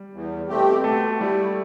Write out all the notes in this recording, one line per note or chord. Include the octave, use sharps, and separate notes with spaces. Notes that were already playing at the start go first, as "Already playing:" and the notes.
Already playing: G3
E2
B2 A3 C4 G4
B2 A3
G3 A3 E4